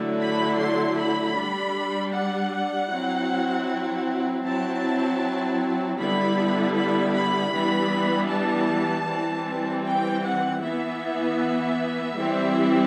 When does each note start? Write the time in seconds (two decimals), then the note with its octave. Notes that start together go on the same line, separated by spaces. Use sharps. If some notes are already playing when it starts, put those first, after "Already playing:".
Already playing: D3 F#3 A3 E4
0.20 B5
0.59 C6
0.97 B5
1.36 G3 D4
2.13 F#5
2.90 F#3 C4 E4
4.44 F#3 C4 E4 A5
5.98 D3 G3 B3 E4 B5
6.76 B5
7.14 B5
7.53 E3 G3 B3 D4
8.30 A5
9.07 E3 G3 C4
9.85 G5
10.23 F#5
10.62 E3 B3 E4 E5
12.16 E3 G3 C4 E4